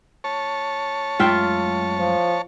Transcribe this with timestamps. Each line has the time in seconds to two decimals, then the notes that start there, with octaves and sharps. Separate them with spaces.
0.24 C#5 A5
1.19 F#2 G#3 A3 F4 E5 G5
1.99 F3